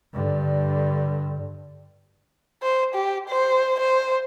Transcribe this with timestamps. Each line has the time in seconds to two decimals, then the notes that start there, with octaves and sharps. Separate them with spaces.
0.13 G2 D3
2.62 C5
2.94 G4
3.29 C5
3.79 C5